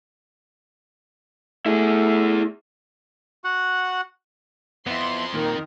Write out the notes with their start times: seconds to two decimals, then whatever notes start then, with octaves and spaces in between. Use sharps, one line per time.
1.66 A3 E4 G#4
3.44 F#4 F#5
4.87 F2 B3 E4 C6
5.34 D#2 A#2 D#3 A#4